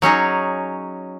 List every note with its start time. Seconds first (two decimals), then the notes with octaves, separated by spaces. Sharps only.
0.02 F#3 C#4 D#4 G#4